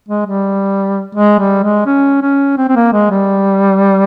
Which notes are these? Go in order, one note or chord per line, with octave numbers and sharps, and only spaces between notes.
G#3
G3
G#3
G3
G#3
C#4
C#4
C4
C4
A#3
G#3
G3